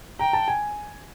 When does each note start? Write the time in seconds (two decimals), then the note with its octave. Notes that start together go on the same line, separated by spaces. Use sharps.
0.19 G5 A#5
0.33 A5
0.48 G#5